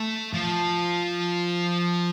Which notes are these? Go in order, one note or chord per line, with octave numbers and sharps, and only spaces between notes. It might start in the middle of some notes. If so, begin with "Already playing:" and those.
Already playing: A3
F3